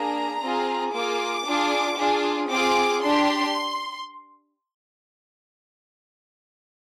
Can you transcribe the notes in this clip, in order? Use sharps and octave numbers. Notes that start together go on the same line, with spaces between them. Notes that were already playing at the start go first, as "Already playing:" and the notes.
Already playing: A#3 D4 G#4 A#5
C4 F4 G#4
A#3 F4 G#4 D6
D4 F4 G#4
D4 F4 G#4
C4 F4 G#4 D6
D4 G4 C6